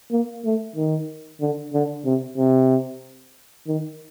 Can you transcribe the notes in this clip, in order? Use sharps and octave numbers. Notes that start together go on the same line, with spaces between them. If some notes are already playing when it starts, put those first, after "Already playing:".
A#3
A3
D#3
D3
D3
C3
C3
D#3